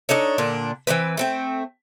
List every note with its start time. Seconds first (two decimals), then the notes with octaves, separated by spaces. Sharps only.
0.09 D4 D#4 A4 C#5
0.38 A#2 D3 D4
0.87 E3 A#3 C4 B4
1.17 A3 C4 G5